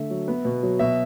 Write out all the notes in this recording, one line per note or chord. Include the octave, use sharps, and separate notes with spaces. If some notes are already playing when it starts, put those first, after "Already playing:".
Already playing: D3 A3 E5
F#3
B3
B2
F#3
B2 E5